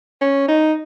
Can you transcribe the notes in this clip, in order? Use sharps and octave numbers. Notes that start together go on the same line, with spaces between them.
C#4
D#4